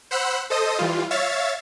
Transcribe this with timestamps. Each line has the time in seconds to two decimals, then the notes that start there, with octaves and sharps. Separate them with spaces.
0.11 C5 F#5 B5 E6 F#6
0.50 A4 C5 D#5 D#6
0.79 E3 G3 F4
1.11 C#5 E5 F5 A6